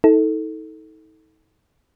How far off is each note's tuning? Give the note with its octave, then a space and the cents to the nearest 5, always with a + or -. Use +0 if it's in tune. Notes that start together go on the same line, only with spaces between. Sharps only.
D#4 +40 A4 +0